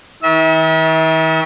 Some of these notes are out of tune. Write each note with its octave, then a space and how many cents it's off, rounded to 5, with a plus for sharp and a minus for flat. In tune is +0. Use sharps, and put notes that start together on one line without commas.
D#3 +45 E5 -35